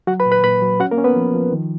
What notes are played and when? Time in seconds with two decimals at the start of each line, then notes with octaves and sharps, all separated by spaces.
0.07 F#3 F#4 F#5
0.20 B4 B5
0.26 A#2
0.32 B4 B5
0.43 A#2 B4 B5
0.62 F#3
0.80 C#4 F#4 F#5
0.91 A#3 A#4
0.98 C#4
1.04 B3 B4
1.16 F3
1.34 F3
1.52 D#3